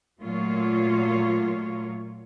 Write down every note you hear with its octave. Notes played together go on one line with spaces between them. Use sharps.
A#2 F#3 A3 A#3 F4 C#5